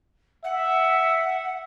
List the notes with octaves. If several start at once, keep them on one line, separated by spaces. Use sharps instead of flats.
E5 F#5